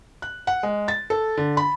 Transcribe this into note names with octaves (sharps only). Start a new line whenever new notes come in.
F#6
F#5
G#3
A6
A4
D3
B5